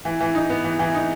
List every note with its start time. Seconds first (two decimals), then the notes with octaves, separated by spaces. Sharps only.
0.05 E3
0.21 E3
0.35 D#4
0.50 B3
0.64 E3
0.79 E3
0.95 D#4